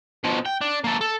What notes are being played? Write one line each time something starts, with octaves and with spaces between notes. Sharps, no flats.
B2 F3
G5
D4
A#3 A4
A4